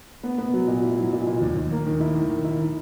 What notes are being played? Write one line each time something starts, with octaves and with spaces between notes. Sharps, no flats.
B3
B3
F#3
A#2
E4
F#3
A#2
A#2
D#2
D#2
A#3
D#3
E4
D#3
D#3
E4
D#3